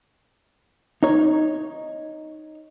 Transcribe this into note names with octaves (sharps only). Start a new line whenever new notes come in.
D#4 C#5